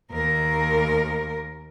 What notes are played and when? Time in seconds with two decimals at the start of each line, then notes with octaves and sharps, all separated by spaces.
0.12 D#2 A#4